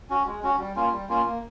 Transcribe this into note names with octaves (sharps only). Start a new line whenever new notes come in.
C#4 F#4
G#3
C#4 F#4
G3
A#3 C#4 F4
G3
A#3 C#4 F4
A#3